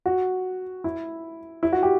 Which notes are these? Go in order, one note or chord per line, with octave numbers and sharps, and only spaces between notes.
F#4
E4
E4
F#4
G4